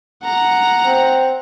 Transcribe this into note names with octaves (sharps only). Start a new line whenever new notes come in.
F#5 A#5
C4